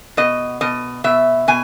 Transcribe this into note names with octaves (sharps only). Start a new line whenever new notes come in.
B2 D#5
B2 D#5
B2 E5
B2 G#5